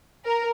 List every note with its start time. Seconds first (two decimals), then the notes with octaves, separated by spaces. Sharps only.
0.25 A#4